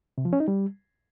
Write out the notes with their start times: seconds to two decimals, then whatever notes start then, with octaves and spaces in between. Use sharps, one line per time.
0.18 C3
0.25 F3
0.33 C#4
0.40 D#4
0.48 G3